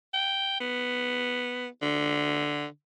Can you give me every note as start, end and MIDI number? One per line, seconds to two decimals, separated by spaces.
0.14 0.56 79
0.61 1.67 59
1.82 2.67 50